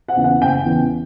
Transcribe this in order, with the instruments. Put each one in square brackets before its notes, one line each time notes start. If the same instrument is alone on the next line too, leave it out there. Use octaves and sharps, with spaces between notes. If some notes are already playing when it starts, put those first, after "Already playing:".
[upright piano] F#5
E2 C#3 E3 B3
F#5
F#1 G5
E2 C#3 E3 B3